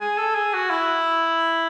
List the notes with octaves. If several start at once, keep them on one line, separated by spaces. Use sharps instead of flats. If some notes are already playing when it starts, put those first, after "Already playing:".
G#4
A4
G#4
F#4
E4